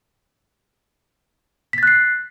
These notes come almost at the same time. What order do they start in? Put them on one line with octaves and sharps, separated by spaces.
B6 A6 F#6 C7